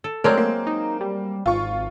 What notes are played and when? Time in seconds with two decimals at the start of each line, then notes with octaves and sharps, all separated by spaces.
0.04 A4
0.24 F#3 G#3 A3 C4 A#4 D5 A5
0.38 A#3
0.67 D#4
1.00 G3
1.46 G#1 F4 C#6